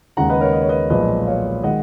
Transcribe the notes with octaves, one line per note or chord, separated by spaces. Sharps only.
D#2 C#3 G#3 F#5 A#5
B4 D#5
A#4 C#5
D#5
C#5
B4 D#5
B1 A#2 F3 G#3 B4 D#5
C#5 F5
D#3 G#3 D#5 F#5